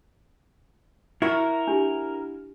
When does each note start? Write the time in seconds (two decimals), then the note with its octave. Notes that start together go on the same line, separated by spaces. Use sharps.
1.22 E4 F#4 A#4 C#6
1.67 D4 G4